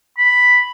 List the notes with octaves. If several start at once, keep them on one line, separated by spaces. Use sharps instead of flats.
B5